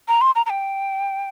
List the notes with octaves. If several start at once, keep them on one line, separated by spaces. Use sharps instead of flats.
A#5
C6
A#5
A#5
G5